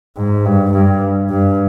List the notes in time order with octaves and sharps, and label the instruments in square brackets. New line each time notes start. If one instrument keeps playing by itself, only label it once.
[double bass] G#2
G2
G2
G2